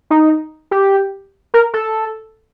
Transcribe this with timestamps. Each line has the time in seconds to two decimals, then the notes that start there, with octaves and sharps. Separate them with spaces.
0.10 D#4
0.71 G4
1.54 A#4
1.74 A4